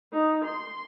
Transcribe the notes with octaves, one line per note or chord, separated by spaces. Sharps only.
D#4
C6